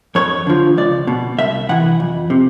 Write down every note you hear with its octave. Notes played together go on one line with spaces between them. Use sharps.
F2 C#5
D3 F3
C#2 D5
B2
C2 E5
C3 E3 F#5
F2
C3